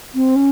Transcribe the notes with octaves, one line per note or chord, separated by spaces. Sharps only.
C4
C#4